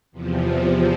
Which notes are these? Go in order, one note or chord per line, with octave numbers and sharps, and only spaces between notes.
E2 C3 F3